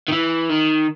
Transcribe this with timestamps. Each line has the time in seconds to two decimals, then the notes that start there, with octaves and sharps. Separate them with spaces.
0.08 D#3
0.12 E3
0.49 D#3